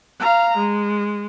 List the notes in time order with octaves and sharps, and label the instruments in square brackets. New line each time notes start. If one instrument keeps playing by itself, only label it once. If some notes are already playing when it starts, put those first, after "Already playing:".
[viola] F5 A#5
G#3